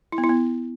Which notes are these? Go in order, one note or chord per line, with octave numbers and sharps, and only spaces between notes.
E4
B3
E4
B3